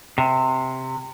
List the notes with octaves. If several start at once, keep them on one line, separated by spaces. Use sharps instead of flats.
C3